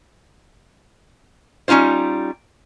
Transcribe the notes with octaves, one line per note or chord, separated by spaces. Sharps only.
G3 C#4 D#4 F4 C5